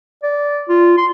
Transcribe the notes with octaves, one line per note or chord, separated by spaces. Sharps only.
D5
F4
C6